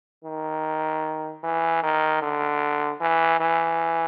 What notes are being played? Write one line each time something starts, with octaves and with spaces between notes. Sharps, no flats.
D#3
E3
D#3
D3
E3
E3